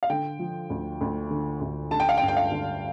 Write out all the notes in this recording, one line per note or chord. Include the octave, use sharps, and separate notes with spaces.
F5
D3 G5
F3
D2
D2
D3
D2
D3 A5
G5
F5
G5
G2
G5
F5
D3